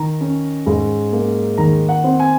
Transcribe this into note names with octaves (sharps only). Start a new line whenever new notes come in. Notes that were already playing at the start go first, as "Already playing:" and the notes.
Already playing: D#3 A#5
C#4
G#2
A#3
D#3 A#5
F#5
C4
G#5